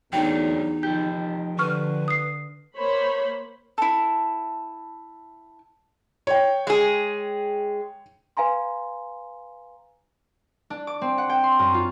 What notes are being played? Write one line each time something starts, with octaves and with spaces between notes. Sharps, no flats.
E2 F#3 A3 D4 D#4 G5
D#3 F3 G4 G6
D3 B4 C#6 F6
D#6 C7
A#3 C5 C#5 B5
E4 A4
C#5 G5
G#3 G#4
B4 F5 G#5 A#5 C6
D4
D6
C4
F#5
G5
C6
F#2
F4